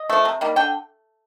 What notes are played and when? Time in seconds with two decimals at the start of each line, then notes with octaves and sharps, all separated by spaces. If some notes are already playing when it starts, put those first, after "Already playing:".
Already playing: D#5
0.10 F3 A3
0.25 C3
0.41 D#3 G3 A#3
0.56 D3 G5